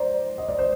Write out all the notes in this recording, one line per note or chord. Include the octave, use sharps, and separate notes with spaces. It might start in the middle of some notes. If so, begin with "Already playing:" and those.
Already playing: C5 D5 A#5
D#5
D5
C5